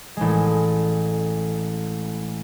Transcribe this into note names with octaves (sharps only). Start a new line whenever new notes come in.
A1 G#3